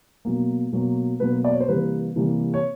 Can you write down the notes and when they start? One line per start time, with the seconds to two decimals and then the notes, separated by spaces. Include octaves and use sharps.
0.25 B2 F#3 A#3
0.73 B2 F#3 A#3
1.20 B2 F#3 A#3 B4
1.44 D5
1.52 C#5
1.60 C5
1.68 C3 E3 G3 A#3 B4
2.16 C3 E3 G3 A#3
2.54 C#5